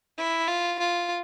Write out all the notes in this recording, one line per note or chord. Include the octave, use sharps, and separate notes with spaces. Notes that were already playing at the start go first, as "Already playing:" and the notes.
E4
F4
F4